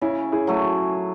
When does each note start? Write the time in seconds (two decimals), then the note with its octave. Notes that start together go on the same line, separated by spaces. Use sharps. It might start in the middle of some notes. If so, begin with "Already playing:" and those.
0.01 C#3 C#4 E4
0.32 E4 G#4
0.47 F#3 A3